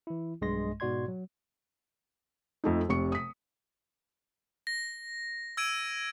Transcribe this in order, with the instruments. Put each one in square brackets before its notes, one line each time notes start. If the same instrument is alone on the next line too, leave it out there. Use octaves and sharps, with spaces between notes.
[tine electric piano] E3 E4
B1 G2 G#3 D#5 C6 A#6
G#2 B2 F#4 D5 C6 G#6
F#3
[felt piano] F2 A3 D#4
F1 C3 C#6 C#7
D#6 B6
[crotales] A#6
E6 G#6 D7 D#7